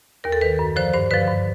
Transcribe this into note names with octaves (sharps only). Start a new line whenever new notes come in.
D#2 A#4
A4
D#3 B4
F#2
D3 F3 C5
G2 C5
D3 F3 B4
G2